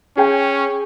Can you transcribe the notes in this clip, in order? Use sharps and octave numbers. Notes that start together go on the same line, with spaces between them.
C#4 G#4 G5